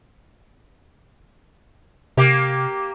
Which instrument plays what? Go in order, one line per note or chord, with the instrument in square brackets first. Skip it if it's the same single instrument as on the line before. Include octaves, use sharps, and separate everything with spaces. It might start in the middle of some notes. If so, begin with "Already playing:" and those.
[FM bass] C3 [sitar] A#3 G4